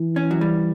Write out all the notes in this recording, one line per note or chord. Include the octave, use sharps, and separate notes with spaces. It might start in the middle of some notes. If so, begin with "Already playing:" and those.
Already playing: E3
C#4
F#3
G3